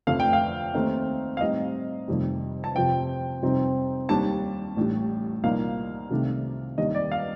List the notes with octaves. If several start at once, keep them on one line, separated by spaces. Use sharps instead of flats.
F1 F2 D3 A3 F5
G5
F5
D#2 D#3 A3 C4 D#4
F5
A2 G3 C4 D#4 D#5
F1 F2 C3 D#3 G3
A5
F2 C3 F3 C4 G5
F2 C3 G3 C4 D#4
D#2 D#3 G3 D4 A5
A1 A2 G3 D4
C2 A#2 F3 A#3 D#4 F5
C2 C3 D#3 A3 D4
D#2 D#3 G3 D4 D#5
D5
F5